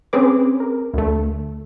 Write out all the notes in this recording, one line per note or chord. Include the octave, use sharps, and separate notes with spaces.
C4 C#4 G#4 B4 D6
A#4
D2 A3